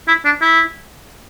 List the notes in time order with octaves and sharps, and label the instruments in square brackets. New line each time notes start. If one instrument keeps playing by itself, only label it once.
[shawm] E4
D4
E4